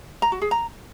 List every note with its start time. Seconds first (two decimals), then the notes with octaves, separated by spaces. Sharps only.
0.22 A#5
0.32 F#4
0.42 G#4
0.51 A#5